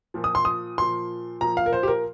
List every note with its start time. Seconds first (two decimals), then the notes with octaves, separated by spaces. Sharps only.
0.14 A#2 F3
0.24 D#6
0.35 C6
0.45 D#6
0.78 A#2 F3 C6
1.41 A#2 F3 A#5
1.57 F5
1.66 A#4
1.73 C5
1.83 G4
1.88 A#4